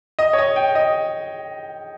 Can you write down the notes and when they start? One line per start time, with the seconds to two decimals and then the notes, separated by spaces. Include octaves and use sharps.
0.19 D#5
0.33 C#5
0.38 D#5
0.56 G5
0.75 D#5